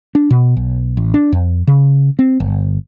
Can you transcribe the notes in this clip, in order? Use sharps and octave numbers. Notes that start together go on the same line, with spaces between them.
D4
B2
B1
A1
D4
F2
C#3
C4
G1